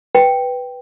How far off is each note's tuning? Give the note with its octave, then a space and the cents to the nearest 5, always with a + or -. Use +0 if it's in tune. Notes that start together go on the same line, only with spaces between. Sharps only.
B4 +0 G5 +0